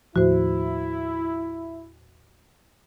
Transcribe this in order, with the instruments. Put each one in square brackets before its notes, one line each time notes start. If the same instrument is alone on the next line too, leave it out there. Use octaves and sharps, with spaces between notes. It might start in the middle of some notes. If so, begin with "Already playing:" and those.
[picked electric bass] D#2 A2 F3 [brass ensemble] E4 [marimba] F#4 C5